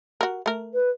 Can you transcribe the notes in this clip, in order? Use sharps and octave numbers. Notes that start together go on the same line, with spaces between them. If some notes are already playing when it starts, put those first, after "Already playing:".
F#4 A#4
A3 A#4
B4